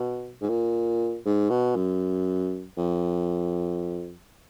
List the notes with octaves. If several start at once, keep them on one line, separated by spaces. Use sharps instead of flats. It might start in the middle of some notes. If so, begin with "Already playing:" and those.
Already playing: B2
G#2
A#2
G#2
B2
F#2
F2